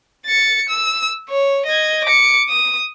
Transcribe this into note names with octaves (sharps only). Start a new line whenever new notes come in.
A6 C#7
E6
C#5
D#5 G#6
D6 C#7
D#6